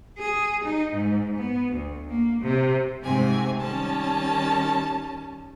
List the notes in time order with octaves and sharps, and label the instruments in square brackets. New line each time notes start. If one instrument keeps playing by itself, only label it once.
[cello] G#4
D#4
G#2
B3
D2
A#3
C3
[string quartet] G#2 C3 A3 C4 G#5
D#3 G3 C#4 A5